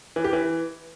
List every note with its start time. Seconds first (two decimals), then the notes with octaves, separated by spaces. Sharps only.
0.16 E3
0.24 G4
0.33 E3